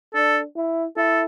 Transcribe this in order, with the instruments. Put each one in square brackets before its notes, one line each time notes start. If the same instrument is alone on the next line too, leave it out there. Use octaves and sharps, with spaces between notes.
[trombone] D4 [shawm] A4
[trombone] E4
[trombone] E4 [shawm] A4